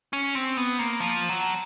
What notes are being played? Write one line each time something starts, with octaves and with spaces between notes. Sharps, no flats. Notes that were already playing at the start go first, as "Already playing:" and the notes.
C#4
C4
B3
A#3
F3
F#3